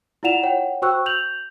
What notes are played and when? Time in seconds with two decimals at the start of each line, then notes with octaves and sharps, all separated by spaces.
0.23 E4 F4 D5 F#5 E7 F7
0.43 C#5 F#5 G5
0.82 F#4 C5 G5 C#6 E6 F#6
1.06 G6 F7 F#7